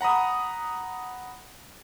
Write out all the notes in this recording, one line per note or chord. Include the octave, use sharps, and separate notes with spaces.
F#5 A#5 B5 D#6